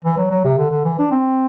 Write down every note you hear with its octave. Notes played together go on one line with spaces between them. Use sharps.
E3
F#3
F#3
C3
D3
D3
E3
D4
C4